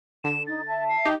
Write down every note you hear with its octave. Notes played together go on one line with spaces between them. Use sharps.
D3 E7
D#4 A6
E5 A5
C7
D#4 G4